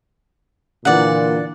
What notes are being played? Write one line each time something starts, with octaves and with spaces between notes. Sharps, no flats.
A#2 D3 E3 D5 F#5